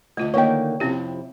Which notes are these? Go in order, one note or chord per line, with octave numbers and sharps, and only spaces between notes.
D2 A3 F4 D#5
D3 D#3 A#3 B4 C#5 D#5 G5
F2 C3 C4 C#4 E4 G4